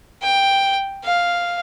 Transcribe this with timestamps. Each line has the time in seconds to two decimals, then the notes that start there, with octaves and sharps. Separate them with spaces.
0.22 G5
1.04 F5